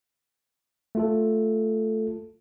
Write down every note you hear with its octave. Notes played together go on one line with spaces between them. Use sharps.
A3 F4 A4